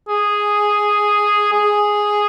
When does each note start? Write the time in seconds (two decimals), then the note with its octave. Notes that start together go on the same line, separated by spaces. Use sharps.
0.09 G#4
1.52 G#4